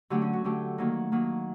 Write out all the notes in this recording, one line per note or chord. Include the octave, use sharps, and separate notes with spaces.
D3 F#3 A3 G4
C#4
F#4
D3 F#3 A3 G4
D#3 F#3 A#3
D#3 F#3 A#3